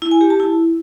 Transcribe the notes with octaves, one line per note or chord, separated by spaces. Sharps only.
E4
G#5
G4
A5
E4